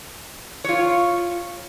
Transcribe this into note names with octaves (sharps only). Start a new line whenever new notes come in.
F4 C#5